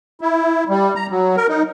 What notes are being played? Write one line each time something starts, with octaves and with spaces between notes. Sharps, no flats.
E4
G3
A#5
F#3
A#4
D#4